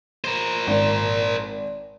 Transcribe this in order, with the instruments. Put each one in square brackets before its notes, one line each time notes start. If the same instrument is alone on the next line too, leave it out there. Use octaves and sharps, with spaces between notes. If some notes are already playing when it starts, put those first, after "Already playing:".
[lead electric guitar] A#4 C5
[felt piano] G#1